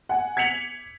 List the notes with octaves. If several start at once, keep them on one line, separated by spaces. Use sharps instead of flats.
F#5 G#5
G#6 B6 C#7 F7 F#7